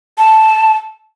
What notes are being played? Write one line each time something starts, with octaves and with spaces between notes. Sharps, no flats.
A5